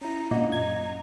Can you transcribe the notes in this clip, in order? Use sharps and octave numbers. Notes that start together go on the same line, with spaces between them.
C#4 E4 A#5
A#2 C#4 D4 D#5 F#5
F#2 A#5 G#6